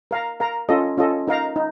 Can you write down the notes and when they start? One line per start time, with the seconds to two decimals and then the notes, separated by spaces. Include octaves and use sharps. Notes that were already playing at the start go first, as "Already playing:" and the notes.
0.11 A#4 F5 A#5
0.40 A#4 F5 A#5
0.69 C#4 F4 A4 D#5
0.98 C#4 F4 A4 D#5
1.28 D#4 A#4 F5 A#5
1.56 D#4